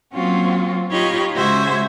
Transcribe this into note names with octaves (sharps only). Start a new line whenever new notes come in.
F#3 A#3 C4 C#4 F4 F#4
D#4 F4 G4 C#5 D#5 B5
C#3 G#3 F#4 C5 E5 G#6